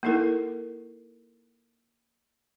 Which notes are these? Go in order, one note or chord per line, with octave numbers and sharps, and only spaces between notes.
A#3 D#4 E4 A4 A#4